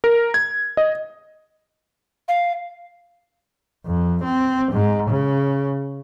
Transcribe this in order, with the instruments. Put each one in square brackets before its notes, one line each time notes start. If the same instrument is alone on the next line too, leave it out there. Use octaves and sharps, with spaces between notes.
[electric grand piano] A#4
G#6
D#5
[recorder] F5
[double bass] F2
C4
G#2
C#3